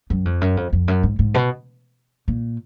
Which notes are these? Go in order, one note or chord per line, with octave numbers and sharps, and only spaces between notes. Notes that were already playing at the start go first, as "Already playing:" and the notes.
F#2
F2
F#2
F2
F2
F#2
G#2
G#2
B2
A#2